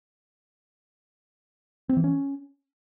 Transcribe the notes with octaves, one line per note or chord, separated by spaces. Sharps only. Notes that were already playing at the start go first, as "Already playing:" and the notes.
C4
E3
C#4